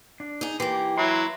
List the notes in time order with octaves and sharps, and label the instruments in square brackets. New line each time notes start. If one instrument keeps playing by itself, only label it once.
[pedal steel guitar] D4
[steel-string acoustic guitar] D#4 G#4
[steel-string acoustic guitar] E3 A#3 [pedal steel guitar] G4 C6
[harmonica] F#3 E4 [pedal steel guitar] C6